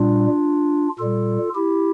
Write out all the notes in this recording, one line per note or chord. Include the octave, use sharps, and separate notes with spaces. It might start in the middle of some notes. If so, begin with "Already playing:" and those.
Already playing: A#2 G3 D4 F4
A#2 G3 F4 A4
E4 G4